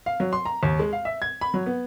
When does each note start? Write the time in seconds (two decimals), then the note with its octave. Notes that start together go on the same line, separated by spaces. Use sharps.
0.06 F5
0.20 F#3
0.33 C6
0.45 A#5
0.63 D#2
0.79 G#3
0.93 F5
1.05 E5
1.22 G#6
1.41 B5
1.54 F#3
1.66 B3